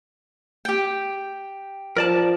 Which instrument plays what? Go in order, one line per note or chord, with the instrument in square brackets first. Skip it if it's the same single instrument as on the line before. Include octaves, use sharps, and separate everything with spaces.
[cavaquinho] G4 G5
[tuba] F3 [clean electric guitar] A#4 D5 A5